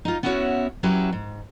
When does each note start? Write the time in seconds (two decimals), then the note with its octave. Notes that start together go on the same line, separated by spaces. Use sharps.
0.05 D#4 F4
0.23 B3 C#4 E4 F#4 A#4 C#5
0.83 F#3 C#4 E4 G4 B4
1.13 G#2